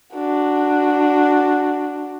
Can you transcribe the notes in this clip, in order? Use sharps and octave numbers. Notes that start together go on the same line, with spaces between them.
D4 F#4